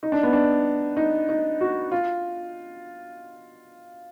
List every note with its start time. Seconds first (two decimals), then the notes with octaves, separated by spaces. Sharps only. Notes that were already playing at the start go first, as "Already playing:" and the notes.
0.03 D#4
0.12 D4
0.23 B3
0.33 D4
0.97 D#4
1.29 D#4
1.61 F#4
1.92 F4